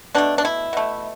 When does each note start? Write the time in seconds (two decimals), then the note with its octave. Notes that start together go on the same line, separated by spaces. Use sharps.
0.15 B2 A3 D4
0.38 D4
0.45 E4
0.73 B2 A3